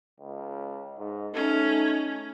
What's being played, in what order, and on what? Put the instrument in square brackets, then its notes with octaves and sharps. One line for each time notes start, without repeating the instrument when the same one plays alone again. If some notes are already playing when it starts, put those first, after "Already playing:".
[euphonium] C#2
G#2
[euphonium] A3 [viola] C#4 [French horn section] D#4